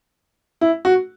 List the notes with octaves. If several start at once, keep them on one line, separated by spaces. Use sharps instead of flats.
E4
F#4